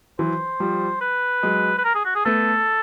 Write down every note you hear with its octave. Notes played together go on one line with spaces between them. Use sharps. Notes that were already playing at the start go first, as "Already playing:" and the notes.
E3 F#3 C5
F3 G3
B4
F#3 G#3
B4
A#4
G#4
F#4
G#4
A3 B3 A4